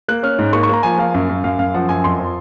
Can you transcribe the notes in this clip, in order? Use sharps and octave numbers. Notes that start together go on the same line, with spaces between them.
A#3 F#6
C#4 F6
G#2
A#3 C#6
C#6
A#3 A#5
F3 G#5
A#3 F5
F#2
F#2
F#2 F5
F#2 F5
F3 F#5
F#2 G#5
F2 C6
F3